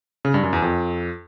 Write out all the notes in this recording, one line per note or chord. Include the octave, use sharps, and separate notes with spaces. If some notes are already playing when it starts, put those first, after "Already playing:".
C#3
G2
F#2
E2
F2